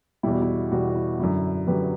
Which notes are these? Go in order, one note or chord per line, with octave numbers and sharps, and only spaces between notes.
E2 B2 G3 E4
F#4
E4
E2 B2 G3 F#4
F#4
E4
F#2 D3 F#3 E4
F#2 D3 F#3 G4 B4